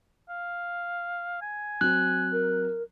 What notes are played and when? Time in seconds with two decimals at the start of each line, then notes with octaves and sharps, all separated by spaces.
0.29 F5
1.42 G#5
1.81 F#3 C4 F#6
2.32 A#4